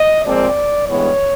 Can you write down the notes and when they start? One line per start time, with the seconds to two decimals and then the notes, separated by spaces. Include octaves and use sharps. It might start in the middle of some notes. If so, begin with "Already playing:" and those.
Already playing: D#5
0.24 A#2 F3 G#3 C4 D5
0.88 G2 E3 G#3 B3 C#5